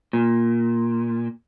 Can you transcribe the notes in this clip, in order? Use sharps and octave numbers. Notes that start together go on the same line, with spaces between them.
A#2